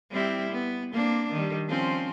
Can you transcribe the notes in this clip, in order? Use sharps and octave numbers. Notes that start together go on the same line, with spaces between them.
G3 C4 E4
B3
A#3 C4 D4
D#3 G3
F3 C4 C#4